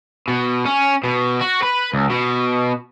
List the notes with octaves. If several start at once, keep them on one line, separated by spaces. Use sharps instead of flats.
B2
C#4
B2
F#4
B4
C#2
B2